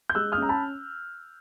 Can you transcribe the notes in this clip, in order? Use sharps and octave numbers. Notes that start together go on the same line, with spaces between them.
G6
G#3 E6 F#6
D#6 F6
C#4 A#5
A5 B5